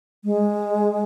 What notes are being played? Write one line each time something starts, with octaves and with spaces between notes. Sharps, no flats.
G#3